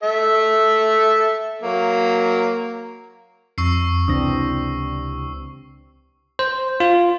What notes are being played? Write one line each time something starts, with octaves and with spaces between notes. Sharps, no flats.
A4 E5
F#3 A#3
F2 C#6 E6 C7
C#2 C3 E3 C4 D4 D#6 A#6
C5
F4